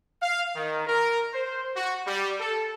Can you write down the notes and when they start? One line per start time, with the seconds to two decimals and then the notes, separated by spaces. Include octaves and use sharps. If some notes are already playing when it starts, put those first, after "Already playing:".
0.22 F5
0.56 D#3
0.87 A#4
1.33 C5
1.76 F#4
2.07 G3
2.40 A4